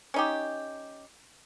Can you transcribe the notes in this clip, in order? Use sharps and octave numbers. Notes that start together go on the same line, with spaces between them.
C#4 D#4 G4